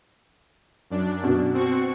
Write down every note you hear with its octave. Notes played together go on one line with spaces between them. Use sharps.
F#2 D4
B2
C4 F#4 C#6